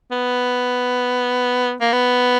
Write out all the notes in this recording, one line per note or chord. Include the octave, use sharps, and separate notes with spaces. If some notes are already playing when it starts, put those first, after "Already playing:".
B3
A#3
B3